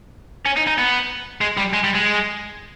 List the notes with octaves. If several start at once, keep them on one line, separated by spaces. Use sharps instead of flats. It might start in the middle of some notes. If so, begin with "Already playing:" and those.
C#4
D#4
D#4
B3
G#3
G3
G#3
G3
G#3